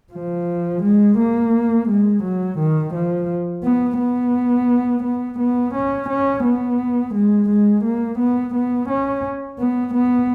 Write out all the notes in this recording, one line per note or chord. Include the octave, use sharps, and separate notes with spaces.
F3
G#3
A#3
G#3
F#3
D#3
F3
B3
B3
B3
B3
C#4
C#4
B3
G#3
G#3
A#3
B3
B3
C#4
B3
B3